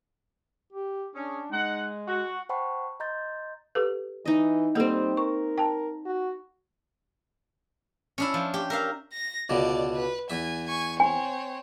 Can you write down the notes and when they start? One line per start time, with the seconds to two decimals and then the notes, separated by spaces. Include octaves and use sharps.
0.72 G4
1.15 C#4 D4 G#4
1.52 G#3 D#4 F#5
2.08 F#4
2.49 C5 F#5 G5 A5 B5 C#6
3.00 D#5 A#5 C6 G6 A6
3.75 G4 A4 B4
4.25 E3 D#4 D#5
4.75 G3 A#3 C4 D#4 A4
5.17 A#4 C#6
5.58 G5 A5
6.06 F#4
8.18 C#4 D4 E4
8.34 F3
8.54 G4
8.70 A#4 E5 F5
9.13 A#6
9.49 C#2 B2 D3 D5
9.94 B4
10.30 E2 E5 G#5
10.67 G#5 C#6
11.00 C4 C#5 G#5